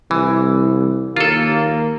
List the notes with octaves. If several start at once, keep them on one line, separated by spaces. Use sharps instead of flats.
C2 E3
D#2 A#3 F4 A4